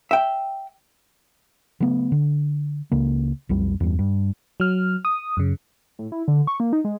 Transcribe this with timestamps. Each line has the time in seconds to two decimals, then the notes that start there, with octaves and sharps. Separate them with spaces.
0.11 E5 G5
1.80 C#3 F#3 A3 B3
2.12 D3
2.92 C#2 C#3 A#3
3.49 B1 F2 G3
3.80 E2 G2
3.99 G2
4.60 F#3 F6
5.05 D#6
5.37 F#2 C#3
5.99 A2
6.12 E4
6.28 D3
6.47 C#6
6.60 A#3
6.73 D#4
6.85 G#3